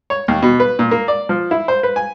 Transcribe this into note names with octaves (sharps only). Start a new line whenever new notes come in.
C#5
D#2
B2
B4
A#2
A#3
D5
F3
E4
C5
B4
G#5